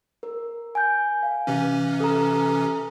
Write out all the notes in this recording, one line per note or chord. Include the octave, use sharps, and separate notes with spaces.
A#4
G#5 G6
F5
C3 E3 C#4
A4 A#5